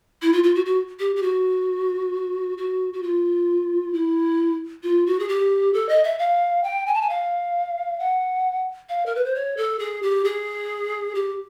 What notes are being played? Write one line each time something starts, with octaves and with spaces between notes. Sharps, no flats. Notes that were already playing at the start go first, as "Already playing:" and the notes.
E4
F4
F4
F#4
F#4
G4
G4
F#4
F#4
F#4
F4
E4
F4
F#4
G#4
G4
A4
D#5
E5
F5
G5
G#5
A5
G#5
F5
F#5
F5
A#4
B4
C5
C#5
A4
G#4
G4
G#4
G4